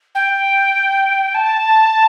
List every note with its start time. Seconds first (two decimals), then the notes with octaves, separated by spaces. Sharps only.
0.15 G5
1.34 A5